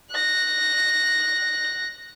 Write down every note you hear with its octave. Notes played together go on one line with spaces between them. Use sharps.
F#6 A#6